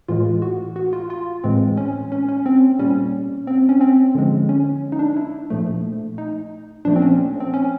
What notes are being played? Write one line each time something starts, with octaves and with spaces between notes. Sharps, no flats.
A2 E3 G#3 F4
F#4
F#4
F4
F4
A2 E3 G#3 C4
C#4
C#4
C#4
C4
A#2 G3 C#4
C4
C#4
C4
D3 F3 G#3
C#4
D#4
D4
E4
A#2 F3 A3
D#4
A#2 F3 A3 D4
C4
C#4
C4
C#4